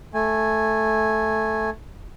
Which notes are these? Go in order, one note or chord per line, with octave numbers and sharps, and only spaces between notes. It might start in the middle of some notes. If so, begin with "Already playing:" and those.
A3 G#5